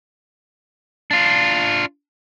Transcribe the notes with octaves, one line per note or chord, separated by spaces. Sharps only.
D4 F4